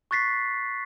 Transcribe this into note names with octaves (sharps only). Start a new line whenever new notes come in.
C#6 F#6 A6 B6 C7